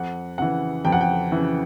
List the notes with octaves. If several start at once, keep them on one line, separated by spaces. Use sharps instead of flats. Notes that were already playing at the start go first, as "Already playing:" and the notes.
Already playing: F2 F#5
C#3 E3 F#5
F2 G5
F#5
G5
C#3 E3